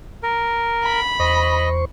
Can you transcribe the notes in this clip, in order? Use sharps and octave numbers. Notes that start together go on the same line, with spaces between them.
A#4
B5
E2 C5 D#5 C#6